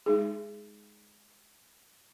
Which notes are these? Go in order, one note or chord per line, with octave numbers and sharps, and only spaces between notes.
G#3 D#4 G#4